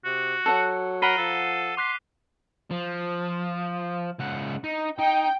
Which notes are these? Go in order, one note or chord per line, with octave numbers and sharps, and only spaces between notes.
C3 F#4
F#3 A4 F#5
A#4 F#5 A#5 B5 C7 D#7 G7
F3 A4
C6 D6 F#6 B6
F3
C#2 F#5
D#4
D#4 G5